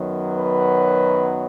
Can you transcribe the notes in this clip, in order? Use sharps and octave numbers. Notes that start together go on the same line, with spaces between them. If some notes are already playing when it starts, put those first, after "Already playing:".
Already playing: F#2 D#3 F#3 B3
B4